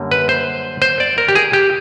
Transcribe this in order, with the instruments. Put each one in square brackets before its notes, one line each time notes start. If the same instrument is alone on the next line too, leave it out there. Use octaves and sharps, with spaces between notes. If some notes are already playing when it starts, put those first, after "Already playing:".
Already playing: [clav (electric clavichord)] F#2 D3 G3 A#3
B4
C5
C5
D5
A#4
G4
G#4
G4